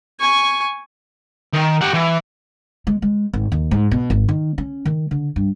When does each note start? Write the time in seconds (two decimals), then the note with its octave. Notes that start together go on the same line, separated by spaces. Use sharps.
0.20 G#5 C#6
1.53 D#3
1.81 G4 F#5
1.94 E3
2.87 G#3
3.02 G#3
3.33 G#1
3.52 D#2
3.71 G#2
3.91 B2
4.10 G#1
4.28 D#3
4.58 C#4
4.85 D#3
5.11 D3
5.36 G2